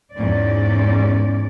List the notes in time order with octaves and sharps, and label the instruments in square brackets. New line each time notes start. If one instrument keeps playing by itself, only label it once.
[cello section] E2 G#2 C#4 D5